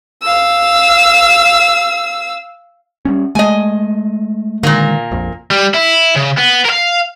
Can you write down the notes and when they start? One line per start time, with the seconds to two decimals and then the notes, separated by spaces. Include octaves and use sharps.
0.23 F5 E6
3.05 G3 G#3 C#4
3.35 G#3 A3 D#5 G#5
4.63 A#2 D3 D#3 G#3 A#3
5.11 A#1 F2
5.50 G3
5.74 E4
6.16 C#3
6.38 B3
6.65 A#4 F5